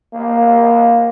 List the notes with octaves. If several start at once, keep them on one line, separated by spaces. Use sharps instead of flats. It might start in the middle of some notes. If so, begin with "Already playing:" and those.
A#3